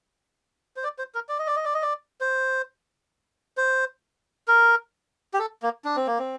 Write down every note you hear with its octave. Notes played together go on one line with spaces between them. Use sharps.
C5
D5
C5
A#4
D5
D#5
D5
D#5
D5
D#5
D5
C5
C5
A#4
G4
A4
A#3
D4
C4
A#3
C4